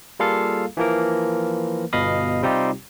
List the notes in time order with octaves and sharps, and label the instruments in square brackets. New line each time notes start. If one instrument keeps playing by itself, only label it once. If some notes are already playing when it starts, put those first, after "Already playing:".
[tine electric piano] G3 A#3 F4 G#4 A4 F5
E3 F3 A#3 A#4
G1 B2 D#5 F5 B5 D#6
C3 G3 C4 D#4 F4 G4